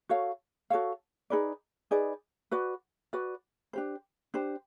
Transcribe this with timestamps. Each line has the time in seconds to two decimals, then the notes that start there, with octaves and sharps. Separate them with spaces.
0.09 F#4 A4 C#5 F5
0.70 F#4 A4 C#5 F5
1.30 D#4 G#4 B4 D5
1.91 D#4 G#4 B4 D5
2.51 F#4 B4 D5
3.13 F#4 B4 D5
3.73 D4 G4 C5
4.34 D4 G4 C5